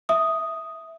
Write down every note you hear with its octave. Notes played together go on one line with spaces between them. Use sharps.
E5 D#6